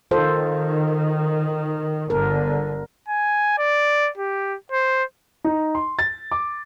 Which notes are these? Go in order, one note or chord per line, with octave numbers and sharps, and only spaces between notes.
D#3 F4 A4 C5
G1 D3 A#4
G#5
D5
G4
C5
D#4
C6
A6
D6